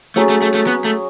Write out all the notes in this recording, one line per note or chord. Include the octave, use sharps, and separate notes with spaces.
F#3 A3 C#4 G#4
A3
A3
A3
B3
A3